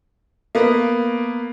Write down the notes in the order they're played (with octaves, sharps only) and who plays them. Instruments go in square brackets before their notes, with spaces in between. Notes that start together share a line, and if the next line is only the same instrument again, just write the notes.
[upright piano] A#3 B3